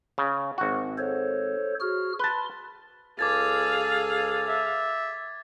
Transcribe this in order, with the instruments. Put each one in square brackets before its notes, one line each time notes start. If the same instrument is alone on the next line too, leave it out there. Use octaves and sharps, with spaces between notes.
[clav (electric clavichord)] C#3
G#1 F#4
[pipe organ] A4 C5 C#5
F#4 G#4 F6
[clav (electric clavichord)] B4 A5 [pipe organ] C6
[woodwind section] C#2 A4 A5 [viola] G#4 F5 [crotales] D6 G#6 A6
[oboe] E5